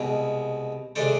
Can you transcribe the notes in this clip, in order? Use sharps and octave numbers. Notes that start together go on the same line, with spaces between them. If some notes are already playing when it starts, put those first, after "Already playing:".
Already playing: C2 B2 G#3 C4
C3 G#3 D4 A4 C5